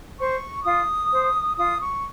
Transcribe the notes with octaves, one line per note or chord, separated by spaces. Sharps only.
C5 C#6
F4 D#6
C5
F4 D#6
C#6